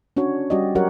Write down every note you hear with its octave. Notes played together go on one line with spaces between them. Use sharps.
C#4 D4 F#4 C#5
G3 C#4 F#4 G4 D5 D#5
F#3 F#4 G4 A#4 C#5 F#5